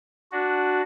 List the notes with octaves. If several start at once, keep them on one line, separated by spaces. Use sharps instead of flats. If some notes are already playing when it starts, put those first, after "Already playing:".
D4 F#4